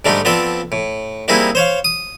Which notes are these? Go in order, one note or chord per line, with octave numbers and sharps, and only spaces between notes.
G#2 D3 G3 A3 D4 D#4
F3 B3 C4 A4 D5
A2
G3 A#3 C4 D#4 E4 G#4
C5 C#5 F5
D#6